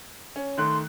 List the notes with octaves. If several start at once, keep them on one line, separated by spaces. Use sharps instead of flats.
C#4
D#3 A3 C6 F#6